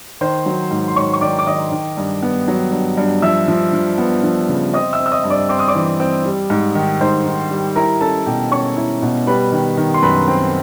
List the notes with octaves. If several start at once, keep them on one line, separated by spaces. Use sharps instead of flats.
D#3 C5 C6
F#3
G#2
C6
G#2 C#5 C#6
C#6
D#3 D5 D6
D6
D#3 D#5 D#6
D#3
G2
B3
F#3
G2
G2
F3 E5 E6
F3
F3
B3
F3
C#3
C4 D#5 D#6
E5 E6
C4
E6
D#5 D#6
G2
D5 D6
C4 D6
D#6
D5 D6
E3
C4
G3
G#2
D#3
G#2 C5 C6
D#3
G3
E4 A#4 A#5
C#4 A4 A5
B2 G4 G5
C#4 C#5 C#6
E4
B2
G3 B4 B5
D#3
D#3
C6
F#2 B4 B5
C4